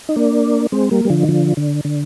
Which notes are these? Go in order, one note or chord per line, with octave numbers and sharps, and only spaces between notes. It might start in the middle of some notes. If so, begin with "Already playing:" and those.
D#4
A#3 D4
G#3 C4
G3 A#3
G3
D3 F3
D#3
D3 F3
D3
D3